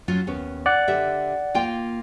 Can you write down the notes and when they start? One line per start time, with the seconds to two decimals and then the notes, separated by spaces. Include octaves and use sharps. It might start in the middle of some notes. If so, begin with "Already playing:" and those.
0.08 F#3 C#4 F4
0.27 D#2 B3 C#4
0.66 D5 F#5 F#6
0.87 D3 G4 E5
1.54 A#3 F4 G5